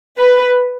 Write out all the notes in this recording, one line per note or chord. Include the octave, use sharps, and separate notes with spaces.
B4